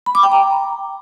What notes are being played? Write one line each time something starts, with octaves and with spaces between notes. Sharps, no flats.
B5
D6
G5
A#5